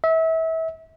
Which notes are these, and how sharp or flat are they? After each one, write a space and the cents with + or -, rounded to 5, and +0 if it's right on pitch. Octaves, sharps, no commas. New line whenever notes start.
E5 -30